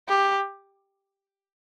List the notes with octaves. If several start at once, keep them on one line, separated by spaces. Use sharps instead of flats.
G4